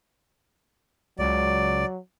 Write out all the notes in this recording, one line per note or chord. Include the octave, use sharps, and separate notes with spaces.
C#2 F#3 D5